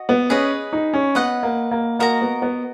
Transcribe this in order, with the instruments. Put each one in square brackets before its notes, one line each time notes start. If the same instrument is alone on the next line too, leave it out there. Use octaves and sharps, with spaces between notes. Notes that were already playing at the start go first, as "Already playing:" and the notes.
Already playing: [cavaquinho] F#4 D#5
[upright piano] B3
[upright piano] C#4 [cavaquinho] G#4 B4 D#5
[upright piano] D#4
C#4
[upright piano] B3 [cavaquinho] B4 D#5 F#5
[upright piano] A#3
A#3
[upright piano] A#3 [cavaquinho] F#4 A#4 D#5 A#5
[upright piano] B3
B3